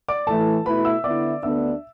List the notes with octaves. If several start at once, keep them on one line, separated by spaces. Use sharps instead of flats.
D5 D6
A2 E3 A3 E4 A4 A5
B2 A3 E4 B4 B5
E5 E6
D3 B3 E4 D5 D6
D2 D3 B3 D4 E5 E6